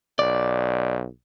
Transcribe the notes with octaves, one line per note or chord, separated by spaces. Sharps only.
B1 D5